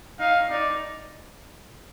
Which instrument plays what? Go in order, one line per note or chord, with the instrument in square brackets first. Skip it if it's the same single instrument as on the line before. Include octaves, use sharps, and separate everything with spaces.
[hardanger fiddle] D#4 [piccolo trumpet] F5
[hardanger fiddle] D#4 [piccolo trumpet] D5